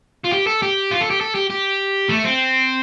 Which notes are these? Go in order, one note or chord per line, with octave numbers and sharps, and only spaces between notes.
F4
G4
A4
G4
F4
A4
G4
A4
G4
G4
A3
C4